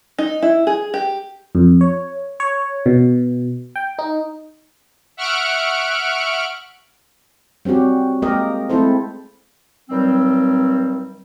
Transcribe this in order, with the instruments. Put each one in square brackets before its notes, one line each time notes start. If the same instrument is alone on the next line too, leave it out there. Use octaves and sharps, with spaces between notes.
[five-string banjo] D#4
E4
G#4
G4
[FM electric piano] F2
C#5
C#5
B2
G5
D#4
[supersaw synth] E5 F#5 C#6 F6 F#6 D7
[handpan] G3 C4 C#4 F#4 G4
G#3 A#3 G4 A#4 D#5
G#3 A3 C4 E4 A4 C5
[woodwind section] G2 D#3 F#3 G3 C4